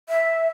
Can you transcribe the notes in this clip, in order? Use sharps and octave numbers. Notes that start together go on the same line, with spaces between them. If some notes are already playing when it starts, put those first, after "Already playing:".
E5